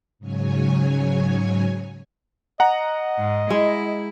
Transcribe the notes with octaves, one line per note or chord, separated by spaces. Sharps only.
G#2 C#3 F#3 C#5 G#5
D#5 F#5 A#5
G#2
G#3 E4